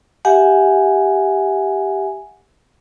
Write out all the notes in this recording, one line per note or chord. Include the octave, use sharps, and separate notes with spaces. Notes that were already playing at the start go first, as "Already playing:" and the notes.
G4 E5 F#5 G#5